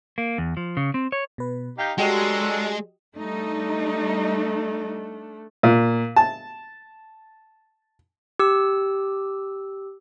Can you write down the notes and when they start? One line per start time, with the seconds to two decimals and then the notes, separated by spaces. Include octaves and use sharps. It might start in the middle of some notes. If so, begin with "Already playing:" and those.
0.18 A#3
0.38 E2
0.57 F3
0.77 C#3
0.94 C4
1.12 C#5
1.38 B2 B4
1.78 D#4 G4 F5 G5 G6
1.98 F#3 G#3 D4 F#4 G4 A4 D#5
3.18 G3 A3 D4 D#4
5.63 A#2
6.16 A5
8.39 G4 E6